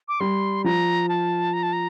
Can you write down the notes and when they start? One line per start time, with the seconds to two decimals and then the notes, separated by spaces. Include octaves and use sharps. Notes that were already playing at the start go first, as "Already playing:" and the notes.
0.08 D6
0.20 G3 C6
0.64 F3 A#5
1.09 A5
1.53 A#5
1.63 A5
1.73 A#5